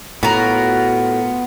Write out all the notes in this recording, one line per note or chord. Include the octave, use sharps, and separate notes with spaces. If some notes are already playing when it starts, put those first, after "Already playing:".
A2 B3 F4 F#4 A#4